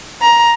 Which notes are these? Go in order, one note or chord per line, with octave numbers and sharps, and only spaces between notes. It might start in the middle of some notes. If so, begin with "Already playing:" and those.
A#5